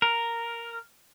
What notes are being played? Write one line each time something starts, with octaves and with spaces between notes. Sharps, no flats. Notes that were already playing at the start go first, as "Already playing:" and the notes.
A#4